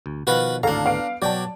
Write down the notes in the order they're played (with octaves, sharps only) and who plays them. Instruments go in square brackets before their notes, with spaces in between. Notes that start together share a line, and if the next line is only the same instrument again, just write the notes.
[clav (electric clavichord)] D2
[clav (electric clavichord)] B2 D#3 F3 [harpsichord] F#4 B4 F5
[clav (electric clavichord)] G#1 D2 A2 [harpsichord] D4 A#5 [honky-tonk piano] A4 F5 A5
[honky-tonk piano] B3 F5 D7
[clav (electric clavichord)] B2 [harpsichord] F#3 G5 [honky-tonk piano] D5 A5